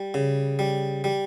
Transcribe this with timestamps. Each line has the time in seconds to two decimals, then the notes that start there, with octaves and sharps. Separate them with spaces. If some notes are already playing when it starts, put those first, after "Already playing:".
Already playing: G3
0.14 C#3
0.59 G3
1.04 G3